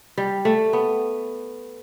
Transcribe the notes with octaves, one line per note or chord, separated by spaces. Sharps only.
G3
A3
B3